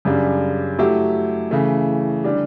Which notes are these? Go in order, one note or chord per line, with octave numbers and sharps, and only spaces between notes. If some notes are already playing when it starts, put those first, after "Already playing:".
F#2 C#3 G3 D4
F#3 A3 E4 G4
C#3 E3 A3
D3 G3 D4 G4